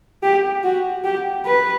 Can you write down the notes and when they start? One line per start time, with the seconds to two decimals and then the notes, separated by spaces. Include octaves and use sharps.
0.23 G4
0.64 F#4
1.04 G4
1.45 B4